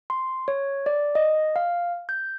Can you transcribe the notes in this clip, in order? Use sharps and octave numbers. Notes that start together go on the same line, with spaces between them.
C6
C#5
D5
D#5
F5
G6